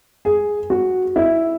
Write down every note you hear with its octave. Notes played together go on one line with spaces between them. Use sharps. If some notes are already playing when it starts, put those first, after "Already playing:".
G#4
F#4
E4